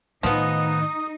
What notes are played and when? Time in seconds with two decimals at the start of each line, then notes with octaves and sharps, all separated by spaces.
0.23 A2 D#3 F3 B3 D#4 D#6